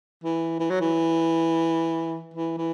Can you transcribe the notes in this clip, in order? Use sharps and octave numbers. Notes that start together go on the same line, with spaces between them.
E3
E3
F#3
E3
E3
E3